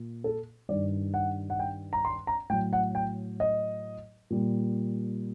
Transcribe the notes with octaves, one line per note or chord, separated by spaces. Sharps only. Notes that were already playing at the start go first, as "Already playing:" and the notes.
Already playing: A#2
A4
G2 D#3 G3 D5
F#5
F#5
G5
A#5
C6
A#5
A2 F#3 G5
F#5
G5
D#5
A#2 G3